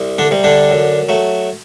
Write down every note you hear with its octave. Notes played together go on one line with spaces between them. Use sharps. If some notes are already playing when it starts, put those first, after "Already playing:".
Already playing: C2
D3 D4
C3 G3
D3 D4
F#2
F#3 A3